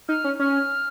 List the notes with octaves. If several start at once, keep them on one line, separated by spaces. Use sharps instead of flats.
D#4 F6
C#4
C#4 F6